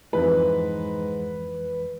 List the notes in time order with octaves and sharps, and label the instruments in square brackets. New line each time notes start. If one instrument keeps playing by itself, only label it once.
[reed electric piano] F2 E3 G#3 [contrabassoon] G#2 [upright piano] B4